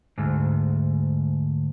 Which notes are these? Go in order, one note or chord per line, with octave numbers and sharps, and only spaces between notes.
D2 G#2